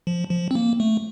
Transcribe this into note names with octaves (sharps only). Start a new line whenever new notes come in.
F3
F3
C4
A#3
A3